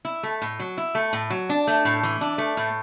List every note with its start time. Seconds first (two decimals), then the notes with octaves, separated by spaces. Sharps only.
0.05 E4
0.23 A3
0.42 A2
0.59 F#3
0.78 E4
0.95 A3
1.13 A2
1.30 F#3
1.49 D4
1.67 A3
1.85 A2
2.03 E3
2.21 D4
2.38 A3
2.57 A2